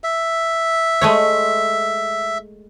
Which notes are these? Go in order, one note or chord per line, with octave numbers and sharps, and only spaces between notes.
E5
G#3 A3 C#5